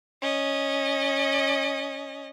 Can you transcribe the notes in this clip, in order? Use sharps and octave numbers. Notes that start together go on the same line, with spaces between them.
C#4 D#5